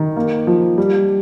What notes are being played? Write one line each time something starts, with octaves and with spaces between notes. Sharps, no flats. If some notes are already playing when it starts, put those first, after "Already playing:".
Already playing: D#3
A#3
F3
G3